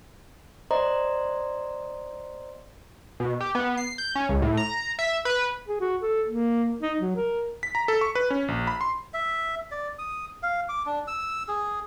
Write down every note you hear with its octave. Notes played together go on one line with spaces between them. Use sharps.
C5 D5 D#5 A#5 C6
B2
G4
B3
C7
G6
C#4
C#2
A2
A#5
E5
B4
G#4
F#4
A4
A#3
D#4
F#3
A#4
B6
A#5
A4
C#6
B4
C#4
A#1
B5
C6
E5
D5
D#6
F5
D6
D4
E6
G#4